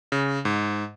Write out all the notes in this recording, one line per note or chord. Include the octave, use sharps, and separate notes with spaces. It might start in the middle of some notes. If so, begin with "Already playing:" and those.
C#3
G#2